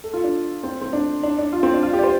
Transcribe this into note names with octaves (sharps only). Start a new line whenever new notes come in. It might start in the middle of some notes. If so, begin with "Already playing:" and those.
A4
F4
D4
C4
C4
D4
D4
D4
F4
C4
D4
F4
G4
D5
C5